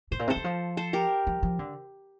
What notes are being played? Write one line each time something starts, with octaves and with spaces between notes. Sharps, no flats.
A2 C5
A#2
C3
A4 C5
E3
F3
A4 C5
G4 A#4
F3
F3
D3